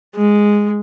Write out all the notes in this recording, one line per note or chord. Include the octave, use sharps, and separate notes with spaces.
G#3